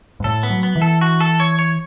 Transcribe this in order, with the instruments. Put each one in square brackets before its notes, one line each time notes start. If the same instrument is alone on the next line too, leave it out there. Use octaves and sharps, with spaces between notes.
[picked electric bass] G#2
[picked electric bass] A2 [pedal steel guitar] A4
[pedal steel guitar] B3
[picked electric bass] F#3
[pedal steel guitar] B3
[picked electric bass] E3
[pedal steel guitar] A4
F#4
A4
C#5
C#5